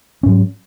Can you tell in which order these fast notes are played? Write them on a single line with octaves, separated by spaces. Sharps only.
C#4 G#2 F#3